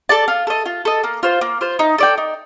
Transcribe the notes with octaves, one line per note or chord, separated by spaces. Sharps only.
A4 D5 A5
F4
A4 D#5
F4
A4 D#5
A#3
F4 C5
A#3
F4 C5
D#4
A4 D5 G5
D#4